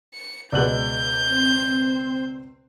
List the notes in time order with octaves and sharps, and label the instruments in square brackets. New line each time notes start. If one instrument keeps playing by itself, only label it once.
[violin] C#7
[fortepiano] C#2 B2 G#3 [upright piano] D5 F#6 F#7 [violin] G6
[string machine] C4 C5